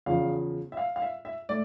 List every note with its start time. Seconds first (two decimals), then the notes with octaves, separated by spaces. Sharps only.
0.06 E2 C#3 F3 F5
0.72 E5
0.77 F5
0.96 F5
1.02 E5
1.25 E5
1.49 A3 D5